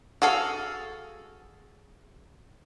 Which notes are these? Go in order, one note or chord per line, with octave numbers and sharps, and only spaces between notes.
F#4 G#4 A4 F5